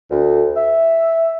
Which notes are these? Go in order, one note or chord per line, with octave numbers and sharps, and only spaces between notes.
D2
E5